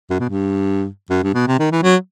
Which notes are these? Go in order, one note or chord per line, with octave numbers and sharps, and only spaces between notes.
F#2
B2
G2
F#2
G2
B2
C3
D#3
E3
F#3